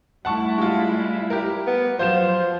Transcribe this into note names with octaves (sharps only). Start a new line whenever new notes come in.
G3 A3 E4 F#5 A5 C#6
G#3 F4
G4 A#4
B3
F3 F#3 C5 G6 E7